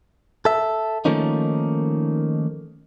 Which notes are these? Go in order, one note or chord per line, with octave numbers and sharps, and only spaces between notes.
A4 E5
D#3 F3 A3 A#3 C#4 D#4